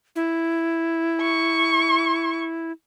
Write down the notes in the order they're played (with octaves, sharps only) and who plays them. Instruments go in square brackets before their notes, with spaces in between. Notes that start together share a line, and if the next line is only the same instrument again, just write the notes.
[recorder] E4
[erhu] C#6